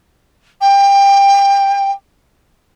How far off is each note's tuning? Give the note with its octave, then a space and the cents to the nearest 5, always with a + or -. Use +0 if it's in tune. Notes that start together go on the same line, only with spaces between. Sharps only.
G5 +20